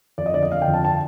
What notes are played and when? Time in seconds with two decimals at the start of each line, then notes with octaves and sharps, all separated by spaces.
0.18 F2 D5
0.26 D#5
0.34 D3 D5
0.43 D#5
0.52 D3 F5
0.62 G5
0.67 F2
0.74 A5
0.85 A5